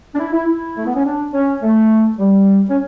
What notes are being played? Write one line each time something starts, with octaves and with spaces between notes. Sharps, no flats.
D4
E4
E4
E4
A3
B3
C#4
D4
C#4
A3
G3
C#4